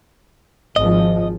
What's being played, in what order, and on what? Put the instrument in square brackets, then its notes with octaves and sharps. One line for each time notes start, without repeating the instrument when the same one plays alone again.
[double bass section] G#1 F3 [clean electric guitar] D#5